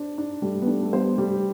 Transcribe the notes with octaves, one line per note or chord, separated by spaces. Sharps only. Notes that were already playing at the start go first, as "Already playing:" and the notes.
Already playing: D4 C5
D4
G3 A3
B3
A3 D4
A3
G3 B3 C5
G3 A3